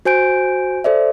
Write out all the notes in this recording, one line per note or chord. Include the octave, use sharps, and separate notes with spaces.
F#4 C5 G#5 G6 D7
A4 C5 D5 E5